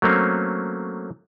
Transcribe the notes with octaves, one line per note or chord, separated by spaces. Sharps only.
F#3 A3 A#3 C4 C#4